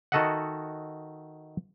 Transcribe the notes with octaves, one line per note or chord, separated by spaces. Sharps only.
D#3 F#4 A4 D#5 E5 F#5